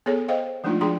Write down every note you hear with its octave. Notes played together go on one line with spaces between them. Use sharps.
B3 G#4 A4 C#5
C5 D#5 F5 G5
F3 G#3 A3 D4 D#4 F4
F3 D4 F#4 G#4 G5 C6